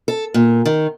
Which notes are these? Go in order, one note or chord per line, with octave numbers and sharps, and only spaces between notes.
A4
A#2
D#3